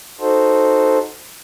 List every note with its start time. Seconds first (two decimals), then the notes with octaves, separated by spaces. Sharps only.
0.20 D#4 F#4 A4 C5